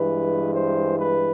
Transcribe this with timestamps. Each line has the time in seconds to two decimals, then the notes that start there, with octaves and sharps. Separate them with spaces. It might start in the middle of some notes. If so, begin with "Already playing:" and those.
Already playing: G2 E3 G#3 B4
0.55 C5
0.99 B4